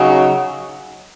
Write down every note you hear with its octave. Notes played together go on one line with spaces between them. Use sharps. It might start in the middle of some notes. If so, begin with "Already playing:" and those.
Already playing: C#3 F#3 D#4